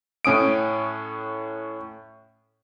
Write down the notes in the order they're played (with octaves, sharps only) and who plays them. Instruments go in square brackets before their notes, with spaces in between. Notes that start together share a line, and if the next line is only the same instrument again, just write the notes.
[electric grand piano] A2 C#4 D#6 D7